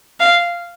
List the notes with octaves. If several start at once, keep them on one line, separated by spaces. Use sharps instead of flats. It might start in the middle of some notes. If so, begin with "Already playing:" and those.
F5